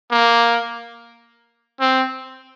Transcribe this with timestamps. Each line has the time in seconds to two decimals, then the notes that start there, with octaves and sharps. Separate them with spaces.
0.12 A#3
1.80 C4